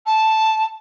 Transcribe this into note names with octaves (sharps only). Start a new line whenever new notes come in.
A5